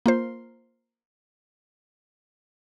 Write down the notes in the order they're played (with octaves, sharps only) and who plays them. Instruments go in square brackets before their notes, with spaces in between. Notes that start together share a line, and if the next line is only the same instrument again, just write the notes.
[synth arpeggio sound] A#3 F4 C5